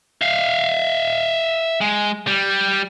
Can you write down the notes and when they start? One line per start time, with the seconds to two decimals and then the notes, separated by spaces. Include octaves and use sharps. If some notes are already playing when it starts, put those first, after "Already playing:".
0.22 E5 F5
1.81 G#3
2.27 G3